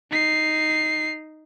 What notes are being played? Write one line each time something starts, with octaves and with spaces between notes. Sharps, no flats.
D#4 C7